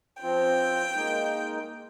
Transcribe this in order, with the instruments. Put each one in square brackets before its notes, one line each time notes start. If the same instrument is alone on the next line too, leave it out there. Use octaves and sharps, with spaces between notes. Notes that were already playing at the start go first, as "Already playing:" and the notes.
[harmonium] F3 C4 F4 [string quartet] G5
[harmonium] G#3 A#3 D#4